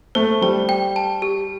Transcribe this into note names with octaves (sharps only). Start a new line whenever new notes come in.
A3 C5
G3 C5
G5
A5
G4